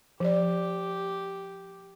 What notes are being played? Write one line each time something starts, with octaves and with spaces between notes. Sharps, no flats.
F3 G4 D5